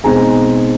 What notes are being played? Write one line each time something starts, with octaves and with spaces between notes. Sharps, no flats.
B2 G#3 C4 D#4 G#5 A#5